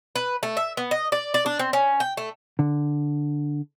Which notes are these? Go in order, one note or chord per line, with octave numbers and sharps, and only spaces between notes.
B4
A3
E5
B3
D#5
D5
D5
D4
C4
C#4
G5
A3
D3